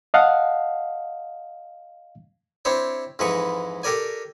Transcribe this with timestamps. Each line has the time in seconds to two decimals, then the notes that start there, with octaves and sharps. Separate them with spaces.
0.14 D#5 F5 F#5 A5
2.65 C4 D4 E4 C5 C#5
3.19 F2 G#2 E3 G#3 B4 C#6
3.83 G4 A4 A#4 D5 G#5